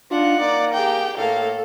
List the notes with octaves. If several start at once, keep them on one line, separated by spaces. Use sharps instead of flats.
D4 D#4 F4 F#5
A#3 D5
G4 G#4 G5
A2 A#3 A4 F5